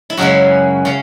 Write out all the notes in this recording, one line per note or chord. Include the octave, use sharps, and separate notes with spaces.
E4
F#2 C#3 G#3 C#4 F#4
C#3 C#4